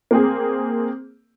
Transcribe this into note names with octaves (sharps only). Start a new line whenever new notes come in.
A#3 C4 G#4